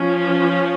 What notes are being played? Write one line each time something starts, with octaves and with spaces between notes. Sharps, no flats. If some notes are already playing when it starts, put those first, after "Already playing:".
Already playing: F3 C#4